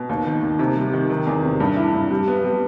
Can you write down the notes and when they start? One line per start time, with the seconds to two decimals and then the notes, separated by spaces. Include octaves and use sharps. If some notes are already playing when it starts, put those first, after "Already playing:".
Already playing: B2
0.09 D#2
0.26 D#3
0.42 D#2
0.59 C3
0.76 G3
0.93 D#3
1.10 D#3
1.27 E2
1.43 C3
1.60 G2
1.77 E4
1.94 G2
2.11 G3
2.28 B3
2.44 G3